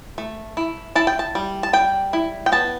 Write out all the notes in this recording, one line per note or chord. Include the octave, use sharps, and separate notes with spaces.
A3
E4
E4 A5
G5
A5
G3
A5
G3 G5
E4
G5
B3 A5